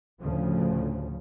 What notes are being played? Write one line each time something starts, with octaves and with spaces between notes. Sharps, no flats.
D2 A2 C#3 F3